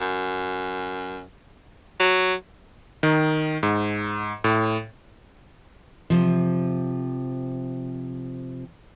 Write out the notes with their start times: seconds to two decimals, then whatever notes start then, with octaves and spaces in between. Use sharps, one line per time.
0.01 F#2
2.00 F#3
3.03 D#3
3.63 G#2
4.44 A2
6.10 C3 F3